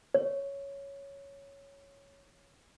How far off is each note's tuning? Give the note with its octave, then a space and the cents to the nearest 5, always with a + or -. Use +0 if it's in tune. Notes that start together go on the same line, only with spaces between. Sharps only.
C#5 +5